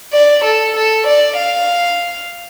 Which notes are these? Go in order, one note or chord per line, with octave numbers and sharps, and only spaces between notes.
D5
A4
A4
D5
F5